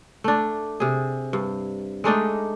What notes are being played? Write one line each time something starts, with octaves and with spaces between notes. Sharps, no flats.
A3 D4
C3 G#4
G2
G#3 A3 D4 D#4